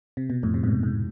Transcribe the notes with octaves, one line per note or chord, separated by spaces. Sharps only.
C3
B2
F2 A2
C3
G#2 B2
G#2